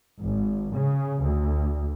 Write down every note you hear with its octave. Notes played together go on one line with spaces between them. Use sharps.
G#1
C#3
D2